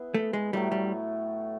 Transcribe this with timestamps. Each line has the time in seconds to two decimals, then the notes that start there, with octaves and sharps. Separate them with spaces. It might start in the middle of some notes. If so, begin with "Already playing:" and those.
Already playing: B3 E4 G#4
0.14 A3
0.33 G#3
0.53 A2 F#3 G3 A3
0.72 G3